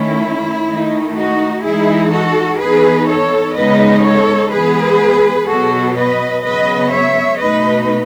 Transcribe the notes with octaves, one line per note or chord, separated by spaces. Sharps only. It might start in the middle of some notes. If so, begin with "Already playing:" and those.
Already playing: D#3 A3 C#4 E4
D#3 A3 D#4
D#4 F#4
E3 G#3 D#4 E4 G#4
F#4 A4
E3 B3 D#4 G#4 B4
A4 C#5
C#3 G#3 B3 D#4 B4 D#5
A4 C#5
E3 G#3 B3 G#4 B4
B2 F#3 B3 F#4 A4
B4 D#5
C#3 F#3 B3 B4 D#5
C#5 E5
B2 A3 D#4 B4 D#5